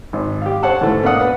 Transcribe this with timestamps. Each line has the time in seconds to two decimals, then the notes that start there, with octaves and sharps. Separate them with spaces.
0.13 G#1
0.42 G4 F5
0.63 C5 C#5 F#5 A5
0.81 G#2 D3 E3 A3
1.03 B2 A#3 D4 F5 F#5 D#6
1.21 B4 F#5